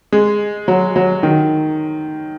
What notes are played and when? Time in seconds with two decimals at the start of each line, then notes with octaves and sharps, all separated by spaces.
0.12 G#3
0.68 F#3
0.96 F#3
1.23 D#3